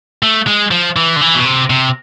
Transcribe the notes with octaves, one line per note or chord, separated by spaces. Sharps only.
A3
G#3
F3
E3
D3
E3
B2
C3
C3